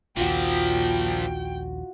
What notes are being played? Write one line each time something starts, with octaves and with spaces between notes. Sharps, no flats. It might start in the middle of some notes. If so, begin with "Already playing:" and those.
A#1 D#2 A#2 F3 F4 F#4 G5